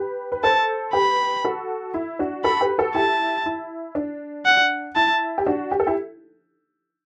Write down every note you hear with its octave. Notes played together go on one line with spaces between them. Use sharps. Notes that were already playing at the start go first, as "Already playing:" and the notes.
Already playing: G4 B4
B4
A4 C5 A5
G4 B4 B5
F#4 A4
E4
D4 F#4
F#4 A4 B5
G4 B4
F#4 A4
E4 G4 A5
E4
D4
F#5
E4 A5
G4
D4 F#4
G4
A4
E4 G4